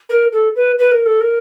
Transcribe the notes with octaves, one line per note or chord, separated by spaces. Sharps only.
A#4
A4
B4
B4
A#4
A4
A#4